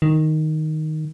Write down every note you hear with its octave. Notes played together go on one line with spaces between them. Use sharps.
D#3